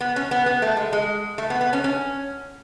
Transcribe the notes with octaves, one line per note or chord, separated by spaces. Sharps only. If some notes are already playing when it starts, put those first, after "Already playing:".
B3
C#4
B3
B3
A3
G#3
G#3
A3
B3
B3
C#4
C#4